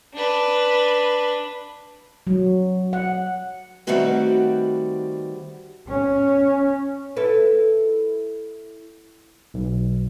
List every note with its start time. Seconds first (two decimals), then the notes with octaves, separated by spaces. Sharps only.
0.14 D4 B4
2.27 F#3
2.93 F#5
3.87 D#3 G3 A3 C4 F#4 B4
5.88 C#4
7.17 E4 A4 B4
9.54 B1